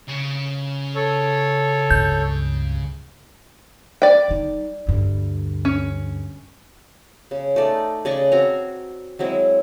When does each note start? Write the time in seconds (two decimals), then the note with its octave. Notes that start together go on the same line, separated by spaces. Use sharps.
0.08 C#3 C#4
0.95 A4 C#5
1.91 C#2 G2 G6
4.02 D5 G5
4.28 G3 D#4
4.87 D2 G2
5.65 C#4
7.31 C#3
7.56 A3 D#4 D5
8.05 C#3 D5 D#5 C#6
8.32 C4 F#4 G#5 A#5
9.19 F#3 G#3 C4 E4